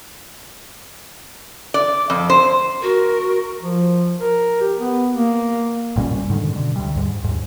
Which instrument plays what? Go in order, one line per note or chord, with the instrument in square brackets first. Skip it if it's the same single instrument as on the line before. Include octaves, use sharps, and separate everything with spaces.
[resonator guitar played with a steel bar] D5
F2
C5
[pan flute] F#4 [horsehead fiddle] A#4
[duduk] F3
A#4
G4
B3
A#3
[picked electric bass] A1 A#2 G3 C#4
G#2 D3 D#3
B2 D3
D2 G3
D#2 G#2
D#2 G#2